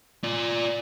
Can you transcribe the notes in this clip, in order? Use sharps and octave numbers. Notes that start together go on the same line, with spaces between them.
F4 D5